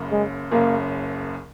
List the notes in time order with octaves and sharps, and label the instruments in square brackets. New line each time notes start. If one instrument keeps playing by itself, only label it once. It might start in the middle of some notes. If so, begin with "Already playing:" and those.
Already playing: [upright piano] F#1 F#2 C#3
[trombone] G#3
[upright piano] F#1 F#2 C#3 [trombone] A#3